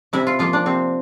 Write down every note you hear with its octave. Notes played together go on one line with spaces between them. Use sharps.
C3 E4
F4
F3 A#3 F4
D4
C3 C4